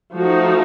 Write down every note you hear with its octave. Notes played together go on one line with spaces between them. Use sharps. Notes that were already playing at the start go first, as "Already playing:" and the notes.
F3 A3 D#4 F#4